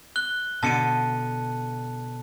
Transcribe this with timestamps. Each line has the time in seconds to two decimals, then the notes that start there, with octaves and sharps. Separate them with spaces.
0.16 F#6 G7
0.63 B2 D3 A5 C#7 D#7